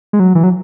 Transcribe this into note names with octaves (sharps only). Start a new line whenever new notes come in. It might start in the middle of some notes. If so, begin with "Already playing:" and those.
G#3
F#3
E3
F#3